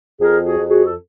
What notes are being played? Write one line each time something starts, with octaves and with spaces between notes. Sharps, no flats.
F2 G#4 A#4
F#4 G#4
F2
F#4 G#4
A4